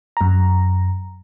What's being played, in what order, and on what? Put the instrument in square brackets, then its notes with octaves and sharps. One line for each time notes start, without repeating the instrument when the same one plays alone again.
[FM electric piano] F#2 A#5